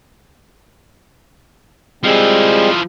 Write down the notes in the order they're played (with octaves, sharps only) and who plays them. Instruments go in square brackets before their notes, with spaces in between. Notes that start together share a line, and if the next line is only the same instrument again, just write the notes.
[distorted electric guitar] F3 E4 [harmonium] G3 G#3 C4